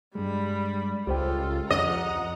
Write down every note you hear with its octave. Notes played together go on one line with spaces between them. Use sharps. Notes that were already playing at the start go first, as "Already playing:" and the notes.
G2 G3 G#3 B5
C#2 F4 G4 A4 C5 G5
F2 D#5 F#5 A#5